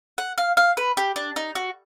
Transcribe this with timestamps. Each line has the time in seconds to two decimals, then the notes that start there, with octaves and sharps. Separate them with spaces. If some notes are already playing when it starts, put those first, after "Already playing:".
0.18 F#5
0.38 F5
0.57 F5
0.77 B4
0.97 G4
1.16 D4
1.36 D#4
1.55 F#4